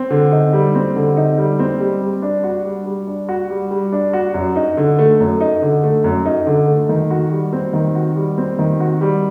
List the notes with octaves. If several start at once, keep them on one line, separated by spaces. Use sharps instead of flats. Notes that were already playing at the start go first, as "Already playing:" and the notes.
Already playing: C4
D3
D#4
G3
C4
D3
D#4
G3
C4
G3
G3
D4
F#4
G3
G3
D4
F#4
G3
G3
D4
F#4
F#2
D#4
D3
A3
F#2
D#4
D3
A3
F#2
D#4
D3
A3
D#3
F#4
G3
C4
D#3
F#4
G3
C4
D#3
F#4
G3